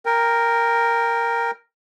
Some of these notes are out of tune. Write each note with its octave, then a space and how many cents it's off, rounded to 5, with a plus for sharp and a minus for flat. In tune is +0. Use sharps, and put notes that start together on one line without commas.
A#4 +0 G5 +20